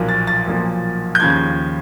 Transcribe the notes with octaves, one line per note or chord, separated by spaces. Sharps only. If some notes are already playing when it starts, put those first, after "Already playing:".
Already playing: B1 A#2 F3 A#3
A6
A6
B1 A#2 F3 A#3
G6
D#2 C#3 F3 G#6